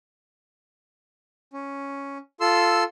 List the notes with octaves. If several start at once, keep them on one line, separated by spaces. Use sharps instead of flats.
C#4
F4 A4 C6 E6